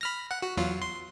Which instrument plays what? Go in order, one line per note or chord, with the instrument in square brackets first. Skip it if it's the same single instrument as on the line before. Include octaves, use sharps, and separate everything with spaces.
[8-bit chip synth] B5 F6 A#6
F#5
F#4
E2 F#3 F4
C6